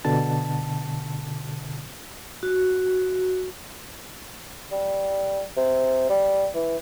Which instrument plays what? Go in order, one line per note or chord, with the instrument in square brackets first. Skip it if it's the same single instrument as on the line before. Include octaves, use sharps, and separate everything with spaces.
[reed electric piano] B2 D3 A5
[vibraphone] F#4
[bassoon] G3
C3
G3
E3